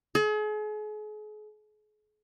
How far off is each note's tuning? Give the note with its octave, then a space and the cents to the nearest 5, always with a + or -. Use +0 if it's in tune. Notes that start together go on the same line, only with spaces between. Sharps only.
G#4 +40